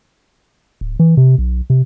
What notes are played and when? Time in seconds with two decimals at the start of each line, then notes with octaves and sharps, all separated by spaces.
0.81 D1
1.00 E3
1.17 C3
1.38 B1
1.70 C3